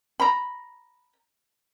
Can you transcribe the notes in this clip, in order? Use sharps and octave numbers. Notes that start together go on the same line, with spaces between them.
A#5 B5